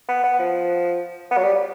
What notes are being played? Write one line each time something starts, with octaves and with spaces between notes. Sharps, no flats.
B3
B3
F3
B3
F#3
G3